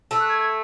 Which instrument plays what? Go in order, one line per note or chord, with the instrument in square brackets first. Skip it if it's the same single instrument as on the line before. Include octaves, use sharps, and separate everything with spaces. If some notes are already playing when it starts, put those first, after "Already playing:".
[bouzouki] A3 [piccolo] E6
[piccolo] F#6
G#6
G#6